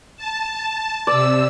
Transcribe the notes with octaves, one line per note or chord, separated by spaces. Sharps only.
A5
C3 D5 E6